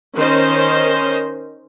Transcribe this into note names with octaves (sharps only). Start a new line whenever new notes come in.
D#3 C#4 C5 D#5